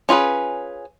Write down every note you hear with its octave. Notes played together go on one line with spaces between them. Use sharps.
C#4 F4 G#4 B4